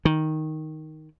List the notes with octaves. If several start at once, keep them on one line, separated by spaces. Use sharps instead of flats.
D#3